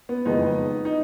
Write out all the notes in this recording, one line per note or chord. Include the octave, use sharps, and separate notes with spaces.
B3
F#1 F2 D#3 G#3 B3 D#4
D#4